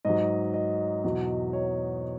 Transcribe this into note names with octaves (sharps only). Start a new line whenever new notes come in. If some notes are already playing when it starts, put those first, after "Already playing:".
G#2 F#3 D#5
D#5
E2 B2 F#3
C#5